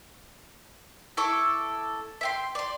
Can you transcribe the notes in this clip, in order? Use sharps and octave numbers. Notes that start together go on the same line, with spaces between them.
E4 A4 C#6 D6
E5 G5 C6
D5 C6